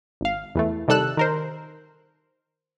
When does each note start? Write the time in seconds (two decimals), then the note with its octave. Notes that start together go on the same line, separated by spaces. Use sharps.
0.21 G#1 F5
0.55 E2 E3 A3
0.88 C3 D#3 G3 A4 E6 F#6
1.17 D#3 A#4 C5